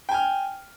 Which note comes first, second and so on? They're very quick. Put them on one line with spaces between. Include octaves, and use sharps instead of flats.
G5 G#5 F6